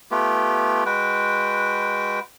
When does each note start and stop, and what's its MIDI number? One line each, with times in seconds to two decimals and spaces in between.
0.11 0.84 57
0.11 0.84 59
0.11 0.84 65
0.11 0.84 67
0.86 2.20 56
0.86 2.20 66
0.86 2.20 71
0.86 2.20 79